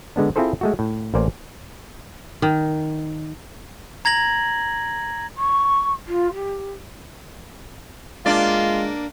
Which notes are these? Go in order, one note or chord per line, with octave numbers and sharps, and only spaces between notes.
D3 G#3 B3 D4
C4 E4 F4 G#4 A4 C5
G#3 A3 F#4
A2
A1 A#3 A#4 C5 D5 G#5
D#3
A#5 G#6 A#6 F#7
C#6
F4
G4
G#3 A#3 D4 F4 D5